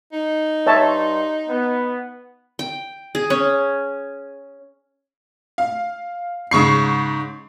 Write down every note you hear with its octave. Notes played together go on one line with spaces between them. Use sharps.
D#4
G2 C#5 E5 A5 C6
B3
G5
G#4
C#4
F5
G#2 C#3 C#6 C7